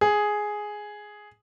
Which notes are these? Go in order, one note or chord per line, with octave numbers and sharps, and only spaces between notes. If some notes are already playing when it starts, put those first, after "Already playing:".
G#4